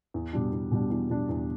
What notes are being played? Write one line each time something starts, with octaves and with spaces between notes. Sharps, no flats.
E2
B2 G3 D4
E2
B2 G3 D4
E2
B2 G3 D4
E2